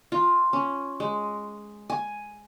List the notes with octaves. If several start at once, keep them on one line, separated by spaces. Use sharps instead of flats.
F4
C#4
G#3
G#5